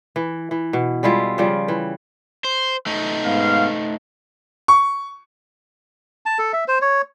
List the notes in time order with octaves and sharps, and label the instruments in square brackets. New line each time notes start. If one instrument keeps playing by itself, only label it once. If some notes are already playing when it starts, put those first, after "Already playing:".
[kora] E3
E3
B2
G3 G#3 E4 F4
C#3 F3 G3
E3
[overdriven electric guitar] C5
A3 D#4
[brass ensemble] G#2 B3 F5
[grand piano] C#6
[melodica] A5
A4
E5
C5
C#5